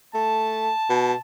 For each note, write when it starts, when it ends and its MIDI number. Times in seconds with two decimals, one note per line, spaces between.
0.14 0.69 57
0.14 1.21 81
0.90 1.13 47